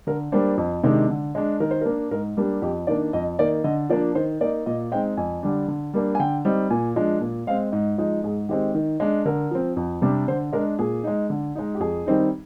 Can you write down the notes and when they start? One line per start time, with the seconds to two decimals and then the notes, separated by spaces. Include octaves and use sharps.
0.07 D3 A#4
0.32 G3 A#3 D4 C5
0.58 F2
0.83 C3 D#3 G#3 D4
1.09 D3
1.35 G#3 D4
1.60 D#3 A#4
1.71 C5
1.81 A#4
1.85 A#3 D4
2.11 G#2 A#4
2.37 G3 A#3 D4 G4
2.62 F2 G4
2.87 D#3 A#3 D4 D5
3.13 F2 D#5
3.39 D#3 A#3 D#4 D5
3.64 D3 D#5
3.90 F3 A#3 D4 D5
4.15 D#3 C5
4.40 A#3 D#4 D5
4.66 A#2 D#5
4.92 G#3 C4 D#4 G5
5.17 F2 G#5
5.43 D3 G3 D4
5.68 D3
5.94 G3 A#3 D4
6.15 G#5
6.19 D3 G5
6.45 G3 C4 D#4
6.70 A#2 G#5
6.96 F3 G#3 D4
7.21 A#2
7.47 G#3 F5
7.50 C4
7.72 G#2 D#5
7.98 F3 G#3 D#4
8.24 G#2 G#4
8.49 D#3 G#3 C4 G4
8.75 D#3
9.00 G#3 D4
9.25 D3 A#4
9.51 F3 C4
9.77 F2
10.02 C3 G3 D4
10.28 D3 C5
10.53 G#3 D4 A#4
10.79 A#2 G#4
11.04 G#3 D#4
11.30 D3
11.55 G#3 D#4
11.75 G4
11.80 F2 G#4
12.06 D#3 G3 C4 D#4